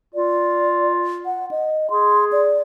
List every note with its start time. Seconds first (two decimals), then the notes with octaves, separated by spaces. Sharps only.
0.14 F4 D5
1.26 F#5
1.51 D#5
1.90 G#4 C6
2.32 D5